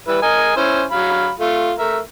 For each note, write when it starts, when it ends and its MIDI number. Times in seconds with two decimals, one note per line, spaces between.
0.08 0.17 55
0.08 0.17 64
0.08 0.17 71
0.22 0.55 70
0.22 0.55 75
0.22 0.55 80
0.56 0.84 61
0.56 0.84 64
0.56 0.84 72
0.91 1.31 54
0.91 1.31 77
0.91 1.31 83
1.40 1.73 57
1.40 1.73 65
1.78 1.99 57
1.78 1.99 70
1.78 1.99 76